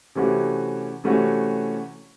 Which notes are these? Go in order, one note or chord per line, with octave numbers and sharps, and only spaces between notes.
C3 E3 A3 C#4 F#4
C3 E3 A3 C#4 F#4